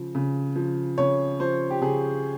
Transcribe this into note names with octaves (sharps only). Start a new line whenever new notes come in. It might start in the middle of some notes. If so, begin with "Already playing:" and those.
Already playing: C#3 F3
C#3
F3
C#3 C#5
F3 C5
G4
C#3 G#4